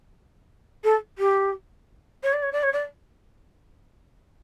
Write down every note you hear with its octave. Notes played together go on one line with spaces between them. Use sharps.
A4
G4
C#5
D5
C#5
D5
C#5
D5